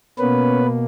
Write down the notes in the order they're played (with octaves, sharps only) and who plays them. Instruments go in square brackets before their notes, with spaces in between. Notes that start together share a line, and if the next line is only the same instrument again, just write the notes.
[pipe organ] B2 A#3 B3 C#4 B4